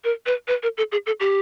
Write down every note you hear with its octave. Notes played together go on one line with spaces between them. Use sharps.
A#4
B4
B4
A#4
A4
G#4
A4
G4